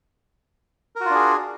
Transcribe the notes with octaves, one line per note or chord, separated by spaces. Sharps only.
D4 F4 F#4 G#4 A#4